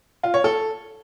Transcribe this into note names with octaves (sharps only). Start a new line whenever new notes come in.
F4
C#5
A4